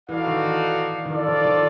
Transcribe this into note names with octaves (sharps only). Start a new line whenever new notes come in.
E3 D#4 F#4 A4 D5 F5
D#3
E3
D#3
E3 F4 A4 D5
D#3 F3
D#3 F3